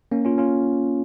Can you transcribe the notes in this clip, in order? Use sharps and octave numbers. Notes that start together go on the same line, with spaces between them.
A#3 C#4
C#4 F4
C#4 F4